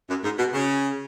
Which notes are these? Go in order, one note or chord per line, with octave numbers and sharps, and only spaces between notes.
F#2
G#2
B2
C#3